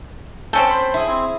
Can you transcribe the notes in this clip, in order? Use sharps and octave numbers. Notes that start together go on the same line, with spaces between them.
C4 C#4 A4 G5
C5 B5
E4 G#4
C4